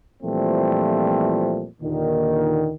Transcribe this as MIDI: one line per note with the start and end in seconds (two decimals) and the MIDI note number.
0.23 1.67 46
0.23 1.67 52
0.23 1.67 53
0.23 1.67 55
0.23 1.67 57
0.23 1.67 60
1.81 2.74 39
1.81 2.74 46
1.81 2.74 50
1.81 2.74 51